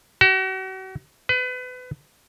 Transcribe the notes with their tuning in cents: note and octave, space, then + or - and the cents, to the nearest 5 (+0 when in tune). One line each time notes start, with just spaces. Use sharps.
F#4 +40
B4 +30